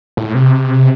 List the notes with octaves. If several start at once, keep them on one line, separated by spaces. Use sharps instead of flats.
A2
C3